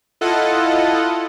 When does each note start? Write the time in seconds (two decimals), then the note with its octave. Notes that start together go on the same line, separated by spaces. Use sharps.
0.21 E4 F4 A4 D#5 F#5